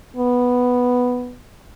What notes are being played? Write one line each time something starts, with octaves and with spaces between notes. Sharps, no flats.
B3